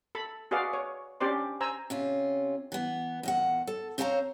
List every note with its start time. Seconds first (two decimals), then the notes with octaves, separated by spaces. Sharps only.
0.15 A4 B5
0.51 F#4 G#4 B4 D5 F5
0.73 C#5
1.20 C#4 D4 G4 C5 D5 C6
1.61 C5 G#5 A#5 E6
1.90 C3 C#4 F4
2.72 E3 B3
3.23 E2 A#2 F#5
3.67 A4
3.98 C4 C5 C#5 F5 A5 A#5